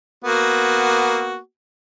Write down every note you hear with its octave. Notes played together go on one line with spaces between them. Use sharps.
A#3 B3 F#4